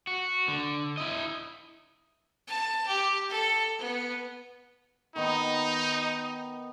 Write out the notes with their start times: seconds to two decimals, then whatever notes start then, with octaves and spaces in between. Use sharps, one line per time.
0.07 F#4
0.48 D3
0.97 E4 D#5
2.48 A5
2.87 G4
3.30 A4
3.79 B3
5.16 D#3 B3 D#4